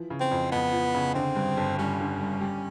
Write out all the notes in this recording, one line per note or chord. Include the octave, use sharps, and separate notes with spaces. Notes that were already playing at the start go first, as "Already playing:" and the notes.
Already playing: E3 F3
C#3
C4
F2
F2 B3
F3
C#3
D3 C4
G2
G1
G3 C#4
D3
G2
G3